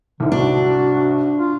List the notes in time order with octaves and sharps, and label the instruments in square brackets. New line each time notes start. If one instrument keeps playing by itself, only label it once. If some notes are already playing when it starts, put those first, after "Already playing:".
[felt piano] C2 G#2 [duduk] D3
[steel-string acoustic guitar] D4 [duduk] F#4
[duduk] F4